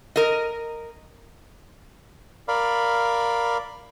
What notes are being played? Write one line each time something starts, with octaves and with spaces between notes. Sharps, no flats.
A#4 D#5
A#4 D5 F5 B5